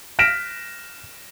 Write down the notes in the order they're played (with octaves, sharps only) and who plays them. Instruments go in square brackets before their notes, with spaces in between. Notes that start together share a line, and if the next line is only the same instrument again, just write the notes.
[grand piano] F6 A#6 B6 D7 E7